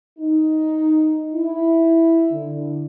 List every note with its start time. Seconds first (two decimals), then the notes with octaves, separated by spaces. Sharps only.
0.19 D#4
1.34 E4
2.32 D3